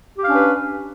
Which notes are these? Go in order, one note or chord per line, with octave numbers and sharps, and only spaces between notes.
C#4 D4 G4 B4 F5